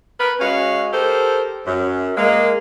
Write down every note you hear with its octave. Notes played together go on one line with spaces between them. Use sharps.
A#4 B4
G#3 C#4 F#4 F5
G4 A4 A#4 C5
F#2
G#3 A#3